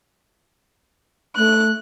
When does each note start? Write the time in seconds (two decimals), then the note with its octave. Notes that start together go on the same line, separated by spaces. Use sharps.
1.37 A3 F#6